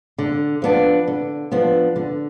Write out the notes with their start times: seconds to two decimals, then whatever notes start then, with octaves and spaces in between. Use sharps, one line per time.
0.18 D3
0.62 F3 B3 D4
1.08 D3
1.52 F3 B3 D4
1.96 D3